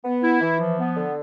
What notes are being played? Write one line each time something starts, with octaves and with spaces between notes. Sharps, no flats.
B3
E4
E3
F3
B3
D3